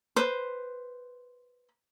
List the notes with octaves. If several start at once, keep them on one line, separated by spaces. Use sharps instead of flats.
B4 C5